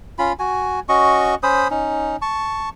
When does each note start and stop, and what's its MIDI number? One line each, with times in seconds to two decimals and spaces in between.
0.19 0.33 61
0.19 0.33 65
0.19 0.33 83
0.39 0.80 66
0.39 0.80 80
0.89 1.35 61
0.89 1.35 66
0.89 1.35 75
0.89 1.35 85
1.43 1.68 61
1.43 1.68 72
1.43 1.68 83
1.43 1.68 87
1.70 2.16 61
1.70 2.16 63
2.22 2.69 81
2.22 2.69 85